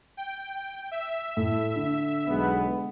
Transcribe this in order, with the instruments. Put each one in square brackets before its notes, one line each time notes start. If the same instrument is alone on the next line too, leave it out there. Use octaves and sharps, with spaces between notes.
[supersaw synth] G5
E5
[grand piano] A2
D3
[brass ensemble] B1 G#3 B3